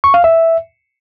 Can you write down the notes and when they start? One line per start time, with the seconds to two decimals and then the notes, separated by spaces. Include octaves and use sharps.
0.04 C#6
0.14 F5
0.24 E5